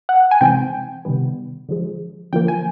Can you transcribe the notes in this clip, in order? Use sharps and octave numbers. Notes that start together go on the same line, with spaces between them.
F#5
G#5
C3 E3 G#3 C4 G5
C3 D#3 G3 B3
D3 F3 G#3
D3 F3 A#3 G5
G#5